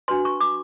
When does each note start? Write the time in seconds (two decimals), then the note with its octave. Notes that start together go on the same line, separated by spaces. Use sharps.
0.08 D4 F#4 B4 C6
0.25 C#6
0.40 D6